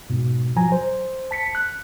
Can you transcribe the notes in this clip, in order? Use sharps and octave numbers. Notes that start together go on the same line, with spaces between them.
G#2 B2
F3 F#3 G#5 A#5
C5
A5 B6 C#7
F#6